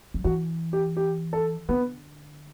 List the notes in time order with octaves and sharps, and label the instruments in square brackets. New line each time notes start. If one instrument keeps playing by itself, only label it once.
[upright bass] F#3
[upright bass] E3 [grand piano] F#4
[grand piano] G4
G4
A4
[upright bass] D3 [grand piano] B3